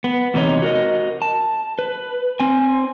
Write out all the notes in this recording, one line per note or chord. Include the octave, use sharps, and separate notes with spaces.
B3
E2 C3 B3 D#4 C#5
F#4 A#4 D#5
A5
B4
C4 G#5